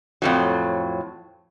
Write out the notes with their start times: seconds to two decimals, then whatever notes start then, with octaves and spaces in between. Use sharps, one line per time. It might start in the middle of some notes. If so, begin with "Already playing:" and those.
0.22 F2 A2 F#3